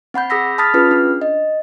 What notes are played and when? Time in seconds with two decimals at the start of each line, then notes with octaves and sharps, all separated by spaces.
0.14 C4 F#5 B5 G6
0.30 G#4 B5 D#6 E6 A#6 B6
0.58 A5 B5 D#6 F6 A6 B6
0.74 C#4 F4 G#4 B4 F6
0.91 D4
1.21 D#5